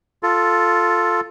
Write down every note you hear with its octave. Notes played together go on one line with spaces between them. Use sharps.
F4 A4